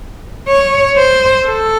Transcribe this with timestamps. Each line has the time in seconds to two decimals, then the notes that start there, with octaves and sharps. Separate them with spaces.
0.48 C#5
0.97 C5
1.46 A4